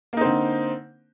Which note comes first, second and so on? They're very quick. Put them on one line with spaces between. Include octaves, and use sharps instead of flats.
A#3 D#4 C4 D3